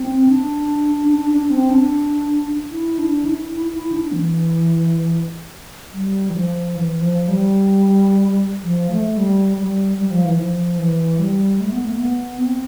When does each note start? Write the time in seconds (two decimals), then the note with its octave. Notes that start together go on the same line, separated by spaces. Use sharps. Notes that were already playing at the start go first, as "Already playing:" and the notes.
Already playing: C4
0.28 D4
1.09 D4
1.30 D4
1.50 C4
1.70 D4
2.71 E4
2.98 D4
3.25 E4
3.52 E4
3.73 E4
3.92 D4
4.12 E3
5.94 G3
6.30 E3
6.35 F3
6.76 E3
7.01 F3
7.28 G3
8.63 F3
8.91 A3
9.17 G3
9.57 G3
9.98 G3
10.11 F3
10.25 E3
10.38 F3
10.79 E3
11.19 G3
11.60 A3
11.72 B3
11.85 A3
11.99 B3
12.40 C4